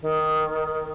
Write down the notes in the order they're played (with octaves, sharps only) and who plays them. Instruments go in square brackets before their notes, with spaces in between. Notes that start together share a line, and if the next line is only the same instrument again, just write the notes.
[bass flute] D#3